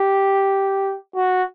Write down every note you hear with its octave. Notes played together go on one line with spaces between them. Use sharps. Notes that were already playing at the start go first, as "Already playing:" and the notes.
Already playing: G4
F#4